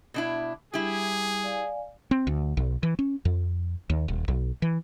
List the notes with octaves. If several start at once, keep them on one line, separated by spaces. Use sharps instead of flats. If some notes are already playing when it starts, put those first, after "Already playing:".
B2 D4 E4
G3 E4 G4 G#4
D5 F5 G#5
C4
D2
B1
E3
C#4
F2
D#2
D#1
B1
E3